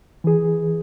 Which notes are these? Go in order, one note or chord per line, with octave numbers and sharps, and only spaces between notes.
E3 G#4